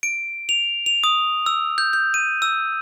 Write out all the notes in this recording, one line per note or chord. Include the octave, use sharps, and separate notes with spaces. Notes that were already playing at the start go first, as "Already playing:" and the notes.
D7
F7
F7
D#6
E6
G6
G6
D#7
E6